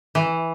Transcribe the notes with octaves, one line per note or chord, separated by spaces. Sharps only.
E3